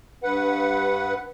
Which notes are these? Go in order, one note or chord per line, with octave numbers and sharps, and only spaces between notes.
G2 B4 F#5